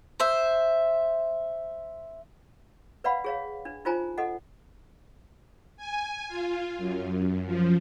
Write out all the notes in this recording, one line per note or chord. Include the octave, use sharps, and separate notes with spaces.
C5 E5
B4 D5 F5 F#5 B5
G#4 C#5 F5
D4
D#4 F4 C5 G#5 A#5
A4 D#5 F#5
G#5
F4
F#2
F3